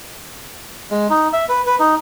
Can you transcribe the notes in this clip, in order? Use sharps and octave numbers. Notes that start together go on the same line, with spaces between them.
G#3
D#4
E5
B4
B4
D#4